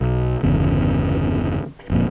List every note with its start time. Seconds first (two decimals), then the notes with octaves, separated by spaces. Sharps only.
0.01 B1
0.43 G1 E2 C#3
1.90 F#1 F2 A#2